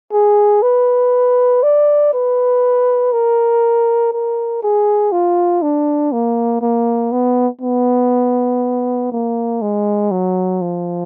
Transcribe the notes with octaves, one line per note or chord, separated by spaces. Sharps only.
G#4
B4
D5
B4
A#4
A#4
G#4
F4
D4
A#3
A#3
B3
B3
A#3
G#3
F#3
F3